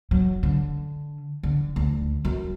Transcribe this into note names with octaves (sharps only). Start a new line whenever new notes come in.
F#3
D3
D3
D2
F#2